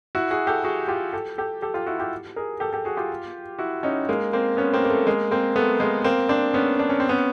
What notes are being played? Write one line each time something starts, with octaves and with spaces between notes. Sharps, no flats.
E4 F#4
F#4 G#4
G4 A4
F#4 G#4
F4 G4
G4 A4
G4 A4
G4 A4
F4 G4
E4 F#4
F4 G4
G#4 A#4
G4 A4
G4 A4
F#4 G#4
F4 G4
E4 F#4
C#4 D#4
G#3 A#3
A#3 C4
B3 C#4
A#3 C4
A#3
A3
G#3 A#3
A#3 C4
A3 B3
G#3 A#3
A#3 C4
C4 D4
B3 C#4
D4
C#4
C4
B3 C#4